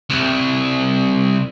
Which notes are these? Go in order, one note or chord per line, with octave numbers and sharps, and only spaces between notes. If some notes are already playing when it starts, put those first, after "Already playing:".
C2